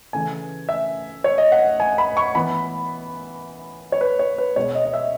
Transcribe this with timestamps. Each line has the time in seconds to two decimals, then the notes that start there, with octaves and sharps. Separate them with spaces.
0.13 C#3 E3 A3 C#4 G#5
0.69 E5
1.24 C#5
1.38 D#5
1.52 F#5
1.80 G#5
1.98 B5
2.17 C#6
2.35 E3 B3 B5
3.92 C#5
4.01 B4
4.19 C#5
4.38 B4
4.56 B2 G#3 B3 C#5
4.75 D#5
4.85 D#5
4.94 E5